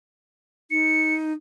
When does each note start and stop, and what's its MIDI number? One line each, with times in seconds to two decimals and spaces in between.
0.71 1.32 63
0.71 1.15 97